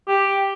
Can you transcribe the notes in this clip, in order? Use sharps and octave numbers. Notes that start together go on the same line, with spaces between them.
G4